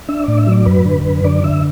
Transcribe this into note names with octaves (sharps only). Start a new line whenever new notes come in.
D4 E5
A2 D5
E5
F#3 D5
F#2 B4
D3
F#2
D3 D5
D3 E5